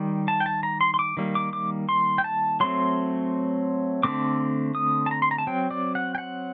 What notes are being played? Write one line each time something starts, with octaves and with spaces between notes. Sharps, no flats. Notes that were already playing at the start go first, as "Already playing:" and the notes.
Already playing: D#3 G3
A5
G5
A5
A#5
C6
C6
D6
D#3 G3 A#3
D6
D6
C6
G5
A5
F#3 A3 C4 C6
D3 A3 C4 D6
D#6
A5
A#5
C6
A#5
A5
F#3 C4 G5
D5
F#5
G5
F#5